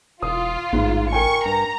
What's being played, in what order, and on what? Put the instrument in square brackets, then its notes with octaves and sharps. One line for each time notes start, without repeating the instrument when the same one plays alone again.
[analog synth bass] E1 [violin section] F4 [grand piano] D#6
[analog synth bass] A1 [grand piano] G#2
[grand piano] A#4 G5 G#5 [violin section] C#6
[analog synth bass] G2 [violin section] A#5